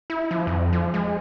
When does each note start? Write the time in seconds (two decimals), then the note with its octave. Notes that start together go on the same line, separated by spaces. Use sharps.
0.10 E4
0.31 F3
0.47 F2
0.73 F3
0.94 G#3